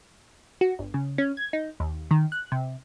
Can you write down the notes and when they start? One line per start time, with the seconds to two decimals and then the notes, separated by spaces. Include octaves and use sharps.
0.61 F#4
0.79 G1
0.94 C#3
1.18 C#4
1.37 G#6
1.53 D#4
1.80 D#2
2.11 D#3
2.32 F#6
2.52 C3